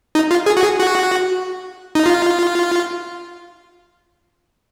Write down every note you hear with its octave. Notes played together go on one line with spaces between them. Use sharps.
D#4
F4
G#4
F#4
G#4
F#4
D#4
F4